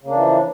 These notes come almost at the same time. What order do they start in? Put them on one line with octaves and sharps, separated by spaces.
C#3 A#3 D4 E3 F3